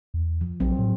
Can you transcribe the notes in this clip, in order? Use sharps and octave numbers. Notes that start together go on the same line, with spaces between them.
E2
F3
A#1 F#3 C4
A2